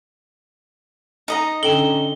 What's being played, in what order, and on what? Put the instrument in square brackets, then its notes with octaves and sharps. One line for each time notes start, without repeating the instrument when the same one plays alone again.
[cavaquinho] D#4 D#5 A#5
[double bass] D3 C#4 [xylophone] A4 G5 E7 [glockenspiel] G7